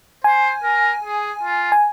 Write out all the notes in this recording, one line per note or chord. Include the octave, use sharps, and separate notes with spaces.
C5 G#5
A#4
G#4
F4
G#5